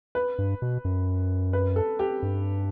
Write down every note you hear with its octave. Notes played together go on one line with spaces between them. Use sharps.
B4
G2
B2
F#2
B4
A4
G4
G2